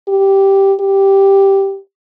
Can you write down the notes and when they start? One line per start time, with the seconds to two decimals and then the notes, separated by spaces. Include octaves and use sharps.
0.08 G4
0.80 G4